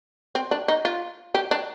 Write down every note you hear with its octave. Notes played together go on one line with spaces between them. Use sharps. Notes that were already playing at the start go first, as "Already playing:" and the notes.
C4
D4
D#4
F4
G4
D4